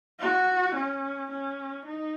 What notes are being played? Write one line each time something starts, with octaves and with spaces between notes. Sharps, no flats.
F#4
C#4
C#4
D#4